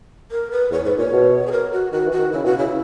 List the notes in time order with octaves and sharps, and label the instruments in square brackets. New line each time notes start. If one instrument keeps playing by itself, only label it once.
[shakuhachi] A#4
B4
[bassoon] E2 [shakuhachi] C#5
[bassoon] G#2 [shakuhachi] B4
[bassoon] A#2 [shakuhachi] C#5
[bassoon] B2
[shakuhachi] G#4
A#4
F#4
[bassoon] D#3 [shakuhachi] F#4
[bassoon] E3
[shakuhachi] F#4
[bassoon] D#3
[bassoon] C#3 [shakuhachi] E4
[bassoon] B2 [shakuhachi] F#4
[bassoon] C#3 [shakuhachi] E4